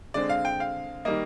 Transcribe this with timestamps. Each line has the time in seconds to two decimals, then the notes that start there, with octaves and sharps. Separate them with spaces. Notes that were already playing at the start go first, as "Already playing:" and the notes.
0.14 D3 G#3 C4 D5
0.29 F5
0.45 G5
0.60 F5
1.05 D#3 G3 A#3 D#5